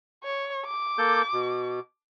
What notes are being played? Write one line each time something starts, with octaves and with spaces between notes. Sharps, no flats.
C#5
D6
A#3 A4 G6
B2